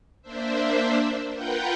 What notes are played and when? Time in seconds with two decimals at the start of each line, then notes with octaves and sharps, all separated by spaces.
0.22 A#3 D4 C5 E5
1.33 F4 A#4 B4 F#5 G5 G6